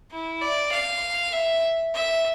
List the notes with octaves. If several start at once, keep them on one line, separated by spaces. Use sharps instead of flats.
E4
D5
F5
E5
E5